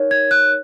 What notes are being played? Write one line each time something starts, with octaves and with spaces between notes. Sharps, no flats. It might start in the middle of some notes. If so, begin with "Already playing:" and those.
Already playing: D#4 A#4 C#5
G#6
F#6